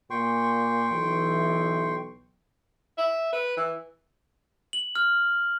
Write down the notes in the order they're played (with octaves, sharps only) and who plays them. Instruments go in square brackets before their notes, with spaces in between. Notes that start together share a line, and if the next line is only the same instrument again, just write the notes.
[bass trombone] A#2 [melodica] G5 C6 C#6
[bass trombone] B1 [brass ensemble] E3
[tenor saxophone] E5
B4
E3
[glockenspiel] F#7
F6